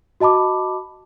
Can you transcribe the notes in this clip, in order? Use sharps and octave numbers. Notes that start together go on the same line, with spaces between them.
F#4 D#5 A5 B5 D6